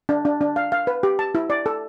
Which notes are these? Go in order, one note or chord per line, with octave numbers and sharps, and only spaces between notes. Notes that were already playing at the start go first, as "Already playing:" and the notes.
D4
D4
D4
F5
F5
B4
G4
A5
E4
D5
A4